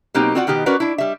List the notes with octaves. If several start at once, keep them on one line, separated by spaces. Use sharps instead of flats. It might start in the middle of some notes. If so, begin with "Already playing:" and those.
B2 F#3 A#3 C4 D#4 G4
C4 F4 F#4 D5 F#5 G5
B2 D#3 B3 G4
C#4 F#4 A#4 B4 D5
D4 E4
G3 E5